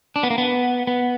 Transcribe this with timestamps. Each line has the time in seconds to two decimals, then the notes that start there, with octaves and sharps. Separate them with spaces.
0.16 D4
0.23 B3
0.30 A#3
0.38 B3
0.87 B3